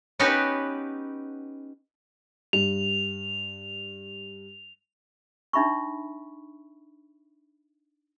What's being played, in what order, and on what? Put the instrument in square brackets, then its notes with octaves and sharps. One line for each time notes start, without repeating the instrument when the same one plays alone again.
[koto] B3 C#4 D#4 F#4 G4 B4
[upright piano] G2 [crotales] F7
[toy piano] D4 D#4 E5 B5 C#6